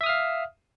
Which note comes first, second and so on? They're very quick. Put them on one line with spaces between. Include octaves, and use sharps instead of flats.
E5 D#6 F6 F5